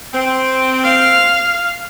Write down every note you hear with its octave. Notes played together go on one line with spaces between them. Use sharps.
C4
F5